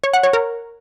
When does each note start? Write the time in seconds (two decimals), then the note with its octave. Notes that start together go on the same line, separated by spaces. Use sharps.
0.04 C#5
0.13 F#5
0.23 C#5
0.33 A#4